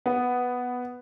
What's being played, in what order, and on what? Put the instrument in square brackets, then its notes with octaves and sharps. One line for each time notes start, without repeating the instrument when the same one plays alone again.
[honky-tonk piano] B3